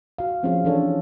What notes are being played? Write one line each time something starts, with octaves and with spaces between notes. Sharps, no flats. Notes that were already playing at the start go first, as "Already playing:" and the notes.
F#4 F5
F3 C4 C#4 F4 G#4 F5
E3 C#4 D4 A4 C#5